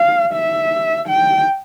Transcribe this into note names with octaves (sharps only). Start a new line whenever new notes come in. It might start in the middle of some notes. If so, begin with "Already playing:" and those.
Already playing: F5
E5
G5